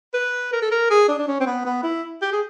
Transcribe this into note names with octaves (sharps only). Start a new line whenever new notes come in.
B4
A#4
A4
A#4
G#4
D4
D4
C#4
C4
B3
B3
E4
G4
G#4